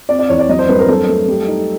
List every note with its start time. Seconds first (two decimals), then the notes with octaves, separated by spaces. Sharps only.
0.09 C4 D5
0.19 D5
0.29 E2 C#5
0.39 D5
0.49 F#3 D#5
0.59 C5
0.69 G2 B4
0.79 A#4
0.88 F#3 A4
1.08 A3
1.28 G3
1.48 D#4